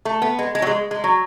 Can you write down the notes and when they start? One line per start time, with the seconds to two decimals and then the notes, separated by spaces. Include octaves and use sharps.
0.05 A3
0.22 B3
0.39 G#3
0.55 G#3
0.62 F#3
0.67 G#3
0.91 G#3
1.04 F#3